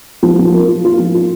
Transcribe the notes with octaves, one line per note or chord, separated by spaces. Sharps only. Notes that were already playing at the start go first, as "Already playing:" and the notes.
F3
F3
A#3
F4
F4
F3
F4